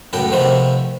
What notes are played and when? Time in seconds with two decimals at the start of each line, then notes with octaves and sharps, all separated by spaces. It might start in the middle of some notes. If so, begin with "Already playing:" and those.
0.13 C#2 F#2 A2 B3 A4 G5
0.32 C3 D#3 F3 A3 B3 C4